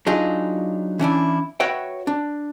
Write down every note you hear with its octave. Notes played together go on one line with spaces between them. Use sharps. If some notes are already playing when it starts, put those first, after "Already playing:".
F#3 D4 D#4 F4 G#4
E3 C#4 D4 E4
F#4 B4 C#5 E5 F#5 G5
D4